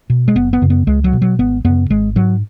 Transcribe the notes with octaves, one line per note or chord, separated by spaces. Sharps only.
B2
G#3
F#1 B3
B3
F#2 C#3
B3
C#2 G#3
F#3
B2
F#3
G#1 B3
F#2 C#3 B3
G#1 G#3
G#2 F#3